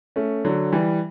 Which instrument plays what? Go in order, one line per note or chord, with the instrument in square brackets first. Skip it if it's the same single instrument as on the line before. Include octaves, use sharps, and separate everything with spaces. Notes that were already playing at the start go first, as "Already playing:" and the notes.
[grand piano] A3 C#4
D3 F#3
E3 G3